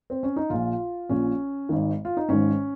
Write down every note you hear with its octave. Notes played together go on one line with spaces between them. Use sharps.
C4
C#4
D#4
A#1 A#2 F4
A#1 A#2 C#4
G#1 G#2 D#3
F4
D#4
G#1 G#2 D#3 C#4